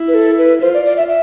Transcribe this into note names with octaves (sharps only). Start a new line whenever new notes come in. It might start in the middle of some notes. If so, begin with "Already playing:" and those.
Already playing: E4
B4
A4
B4
F4 C5
D5
D5
E5
E5